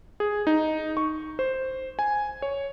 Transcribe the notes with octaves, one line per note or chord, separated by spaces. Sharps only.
G#4
D#4
C#6
C5
G#5
C#5